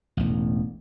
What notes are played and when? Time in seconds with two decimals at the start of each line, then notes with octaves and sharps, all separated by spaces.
0.17 E1 A1